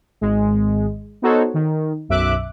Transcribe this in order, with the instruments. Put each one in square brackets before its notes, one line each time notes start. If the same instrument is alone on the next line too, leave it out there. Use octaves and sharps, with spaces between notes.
[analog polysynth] G#1 G#3
B3 D#4 F#4 A4 C5 C#5
D#3
B1 F#2 E5 D6 F#6